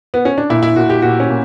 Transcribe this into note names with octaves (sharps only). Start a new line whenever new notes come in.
B3
C#4
D4
A#2 E4
E4
A#2 F#4
G4
A#2 F#4
C#4
A#2